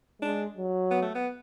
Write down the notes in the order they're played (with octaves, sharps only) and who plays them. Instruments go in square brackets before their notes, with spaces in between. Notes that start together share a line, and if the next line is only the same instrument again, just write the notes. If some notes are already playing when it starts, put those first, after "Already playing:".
[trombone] G#3 [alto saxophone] D4
[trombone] F#3
[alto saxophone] B3
A3
B3